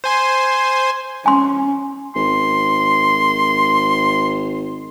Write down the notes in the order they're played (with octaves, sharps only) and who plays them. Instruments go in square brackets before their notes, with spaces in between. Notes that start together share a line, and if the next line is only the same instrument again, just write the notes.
[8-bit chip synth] C5 G#5 C6
[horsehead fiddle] C#4 [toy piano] G#5 C6
[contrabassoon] G#1 [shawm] C6